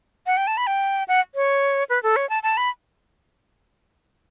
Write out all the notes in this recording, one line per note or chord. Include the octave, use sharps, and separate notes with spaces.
F#5
G5
A5
B5
G5
F#5
C#5
B4
A4
C#5
A5
A5
B5